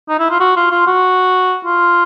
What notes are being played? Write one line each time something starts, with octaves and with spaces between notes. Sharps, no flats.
D#4
E4
F4
F#4
F4
F4
F#4
F4